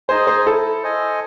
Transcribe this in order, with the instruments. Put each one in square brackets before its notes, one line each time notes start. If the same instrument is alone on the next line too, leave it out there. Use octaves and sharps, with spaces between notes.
[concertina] D#4 G#4 D#5 G#5 [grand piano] C5
[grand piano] C5
[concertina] E4 [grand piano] A4
[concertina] C5 D#5 G#5